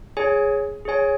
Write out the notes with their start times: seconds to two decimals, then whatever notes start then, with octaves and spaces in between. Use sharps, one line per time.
0.17 G#4 C#5 G#5
0.85 G#4 C#5 G#5